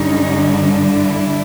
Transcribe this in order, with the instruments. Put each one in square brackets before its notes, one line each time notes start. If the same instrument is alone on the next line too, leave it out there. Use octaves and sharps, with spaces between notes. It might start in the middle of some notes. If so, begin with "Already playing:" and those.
Already playing: [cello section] G2 D3 G3 C#4 D#4
D4 E4